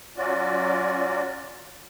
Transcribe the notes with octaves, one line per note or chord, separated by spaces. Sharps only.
F#3 C#4 F4 F#4 D5